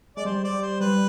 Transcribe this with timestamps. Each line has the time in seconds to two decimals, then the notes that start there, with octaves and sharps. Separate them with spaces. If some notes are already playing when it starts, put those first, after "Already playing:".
0.16 G#3 D5
0.25 G3 C5
0.44 D5
0.52 G3
0.62 C5
0.80 G3 B4
0.93 G3